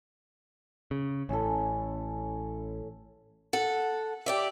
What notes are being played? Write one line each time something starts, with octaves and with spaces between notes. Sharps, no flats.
C#3
A1 C#4 E4 A4
A4 F#5
G4 D5 E5